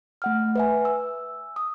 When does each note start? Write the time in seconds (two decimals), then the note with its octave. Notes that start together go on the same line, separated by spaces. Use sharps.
0.22 A3 F#5 F6
0.55 B4 E5 G#5
0.85 E6
1.56 D#6